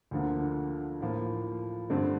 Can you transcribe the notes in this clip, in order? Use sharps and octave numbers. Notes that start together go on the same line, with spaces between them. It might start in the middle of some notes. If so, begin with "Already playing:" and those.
D2 D3 F3 A#3
A2 F3 A#3
G2 D3 A3 C4